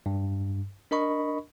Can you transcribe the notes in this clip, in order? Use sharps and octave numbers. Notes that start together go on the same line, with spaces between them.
G2
D4 A#4 D#5 B5 C#6